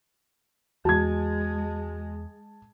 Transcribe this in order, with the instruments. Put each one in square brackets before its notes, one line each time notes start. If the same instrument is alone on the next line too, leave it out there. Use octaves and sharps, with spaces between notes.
[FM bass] E2 [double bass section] G#3 [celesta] F#4 [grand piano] A5 G#6